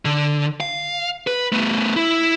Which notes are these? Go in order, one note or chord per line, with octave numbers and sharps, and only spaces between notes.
D3
F5
B4
A3 B3
E4